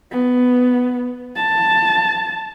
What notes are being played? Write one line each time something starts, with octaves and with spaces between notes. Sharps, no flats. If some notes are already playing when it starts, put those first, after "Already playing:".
B3
A5